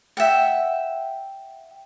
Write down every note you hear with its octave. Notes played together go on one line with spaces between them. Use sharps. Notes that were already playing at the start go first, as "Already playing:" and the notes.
E5 F#5 G5